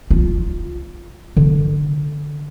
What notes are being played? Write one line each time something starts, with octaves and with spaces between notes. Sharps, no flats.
F4
D3